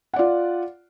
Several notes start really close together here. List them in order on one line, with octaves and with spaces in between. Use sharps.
F#5 D5 F4